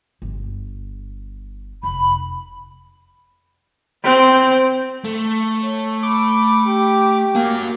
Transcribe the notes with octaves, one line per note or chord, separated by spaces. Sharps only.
G1
F1 B5
C4
A3
C#5
B5 D6
G4
A#3 F#4 G#5